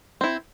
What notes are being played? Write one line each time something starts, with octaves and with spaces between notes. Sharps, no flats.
C4 E4